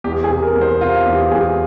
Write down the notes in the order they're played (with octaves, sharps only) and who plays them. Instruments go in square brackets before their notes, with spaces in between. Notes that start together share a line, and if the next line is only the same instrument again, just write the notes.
[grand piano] E2 G4
G#4
C3
A#4
E2
C5
C3 F4
E2 G4
E2 G#4